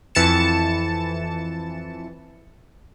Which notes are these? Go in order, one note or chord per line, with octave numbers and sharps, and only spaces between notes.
F2 E3 A5 A6 C#7 E7